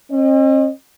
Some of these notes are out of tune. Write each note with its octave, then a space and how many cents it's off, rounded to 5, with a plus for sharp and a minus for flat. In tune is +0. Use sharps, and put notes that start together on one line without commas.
C4 +45 D#5 -25